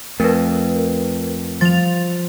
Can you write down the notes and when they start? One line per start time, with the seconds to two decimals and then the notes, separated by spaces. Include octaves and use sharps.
0.20 F2 A3 A#4 B4
1.61 F3 A6 F7